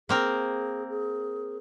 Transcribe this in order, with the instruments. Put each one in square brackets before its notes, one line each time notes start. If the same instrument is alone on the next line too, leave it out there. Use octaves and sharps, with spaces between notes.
[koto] A#3 C4 A#4 [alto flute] G#4
[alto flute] G#4